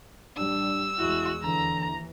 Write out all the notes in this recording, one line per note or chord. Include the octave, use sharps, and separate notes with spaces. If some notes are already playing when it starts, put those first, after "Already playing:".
A1 G3 D4 E6
E2 G#3 E4 F#4
D#2 D3 E3 A#5